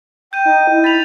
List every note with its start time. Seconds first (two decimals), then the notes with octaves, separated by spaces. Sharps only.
0.33 G5 G6 D#7
0.45 D#4
0.70 E4
0.84 B5 A6 F7